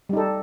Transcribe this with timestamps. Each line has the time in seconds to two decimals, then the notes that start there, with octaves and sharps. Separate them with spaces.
0.09 G3
0.13 D#4
0.17 A4